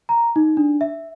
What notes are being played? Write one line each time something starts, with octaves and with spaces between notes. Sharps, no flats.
A#5
D#4
D4
E5